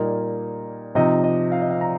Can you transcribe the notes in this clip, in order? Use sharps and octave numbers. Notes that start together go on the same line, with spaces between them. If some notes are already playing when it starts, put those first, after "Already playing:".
Already playing: A#2 G3 A#3 D#4
C3 F3 D#4 D#5
D#5
F5
D#5
F5
A#5